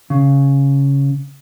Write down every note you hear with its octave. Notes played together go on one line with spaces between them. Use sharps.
C#3